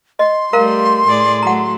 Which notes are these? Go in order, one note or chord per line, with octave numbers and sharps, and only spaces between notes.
D#5 C6
G3 A3 A#4 F5 A#5
A2 G#4 D5
F#3 A3 F#5 A#5